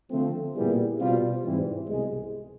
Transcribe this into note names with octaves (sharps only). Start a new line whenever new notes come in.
D3 F3 A3 C4
A#2 G3 B3 E4 G#4
B2 G3 C4 F4
G#2 E3 G3 C4
C2 B2 G#3